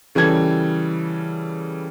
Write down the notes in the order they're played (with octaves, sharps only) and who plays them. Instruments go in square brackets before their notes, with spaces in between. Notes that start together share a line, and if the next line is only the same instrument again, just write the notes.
[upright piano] C#3 E3 G3 A4 G#6